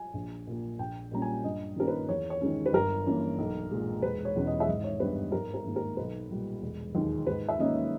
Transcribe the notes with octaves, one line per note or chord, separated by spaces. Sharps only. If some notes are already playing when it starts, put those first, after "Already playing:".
Already playing: G#5
A#1
A#2 A#3
A#1 G5
A#2 G3 A#3 C#4 A#5
G#5
G2 D#5
D#3 A#3 C#4 A#4
B4
E2 C#5
C#5
D#3 G#3 C#4
B4
G1 A#4
G2 E3 A#3 C#4
B1
A#2 G#3
E1 B4
C#5
E2 B2 G#3 C#4
D#5
E5
G#1 D#5
C#5
G2 G3 B3 B4
G#1 A#4
A#4
G#2 D#3 A#3
A#4
B1 B4
A#2 G3
E1
D#2 D#3 G#3
G#2 B4
E5
D#3 A#3 C#4 D#5